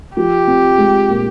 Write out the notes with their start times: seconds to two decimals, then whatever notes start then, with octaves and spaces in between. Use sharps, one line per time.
0.17 F3 G4
0.47 C4
0.78 G#3
1.09 A#2